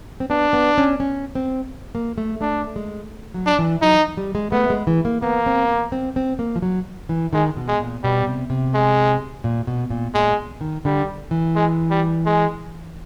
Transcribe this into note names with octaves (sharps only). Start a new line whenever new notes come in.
C4
B3 D4
B3
C#4
C#4
C4
A#3
A3
A3 D4
G#3
F#3
D4
E3
F#3 D#4
G3
G#3
A3 B3
G#3
E3
A#3
A#3 B3
C4
C4
C4
A#3
F3
F#3
E3
D#3 G#3
B2
G#3
A#2
B2 G3
C3
C3
G#3
A#2
B2
A#2
A#2 G#3
D#3
D3 G3
E3
G#3
G3
G#3